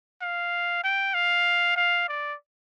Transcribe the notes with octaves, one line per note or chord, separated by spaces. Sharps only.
F5
G5
F5
F5
D5